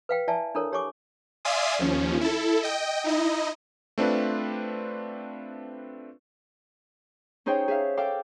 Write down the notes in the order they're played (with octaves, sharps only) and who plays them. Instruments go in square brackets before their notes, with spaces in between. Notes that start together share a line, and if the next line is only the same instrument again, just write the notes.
[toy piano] B4 F5 G5
E4 D5 E5 G#5 A5
D4 E4 A4 A#4 C#5
G4 C#5 G#5 C#6 D6
[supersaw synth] D5 E5 F5 G#5 C6 D#6
D#2 F3 C#4
E4 A4
D#5 G5
D#4 E4 D#5
[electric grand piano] A3 C4 D4 F4 B4
[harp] C#4 D#4 G#4 C5 C#5 G5
G#4 E5 F5
A4 F5 G5 D6